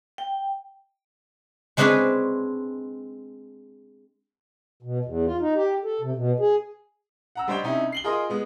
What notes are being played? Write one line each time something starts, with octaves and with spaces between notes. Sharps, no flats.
G5
G#3 C4 D4 G#4 B4 C#5
B2
E2
F4
D#4
G4
A4
C3
B2
G#4
F#5 A#5 E6
G3 D4 C5 C#5 D#5 G5
C3 C#4 D#4 E4
C7 F#7 G7
F4 G#4 A#4 D#5 C6 D#6
G#3 B3